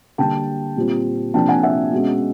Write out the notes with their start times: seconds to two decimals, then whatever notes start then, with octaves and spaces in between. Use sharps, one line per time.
0.18 D3 G3 A#3 G5 A5
0.76 A#2 G3 C4 F4
1.34 C3 F3 A#3 D4 G5 A5
1.48 F#5 G#5
1.63 E5 F#5
1.92 B2 G#3 C#4